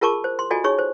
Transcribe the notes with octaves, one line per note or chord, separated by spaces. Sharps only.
F4 G#4 A#4 A5 C#6 D6
C5
C6
F4 F#4 A4 D5 D#5 G#5
D#4 G#4 C#5 C#6
C5